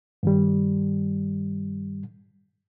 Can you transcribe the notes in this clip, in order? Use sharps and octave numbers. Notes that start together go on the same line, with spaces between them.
G2 D#3 G3